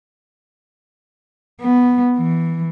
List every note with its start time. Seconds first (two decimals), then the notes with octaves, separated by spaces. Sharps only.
1.61 B3
2.17 E3